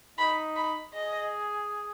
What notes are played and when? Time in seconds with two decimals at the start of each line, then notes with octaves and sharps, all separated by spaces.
0.18 D#4 B5
0.56 B5
0.94 G#4 D#5